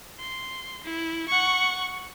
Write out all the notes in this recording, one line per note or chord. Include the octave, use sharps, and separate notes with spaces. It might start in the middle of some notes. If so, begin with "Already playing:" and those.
C6
E4
F#5 C#6